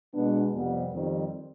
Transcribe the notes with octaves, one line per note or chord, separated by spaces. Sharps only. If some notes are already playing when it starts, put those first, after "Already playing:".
B2 G#3 B3 D4
F2 C3 G3 B3
F2 D#3 G3 C4